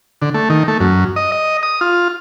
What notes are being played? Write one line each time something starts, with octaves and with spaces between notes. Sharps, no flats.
D3
A3
D#3
A3
F#2
D#5
D#5
D#6
F4